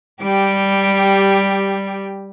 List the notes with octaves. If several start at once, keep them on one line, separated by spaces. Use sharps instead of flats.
G3 G4